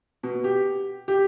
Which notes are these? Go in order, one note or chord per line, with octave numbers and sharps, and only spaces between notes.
B2
G4
G4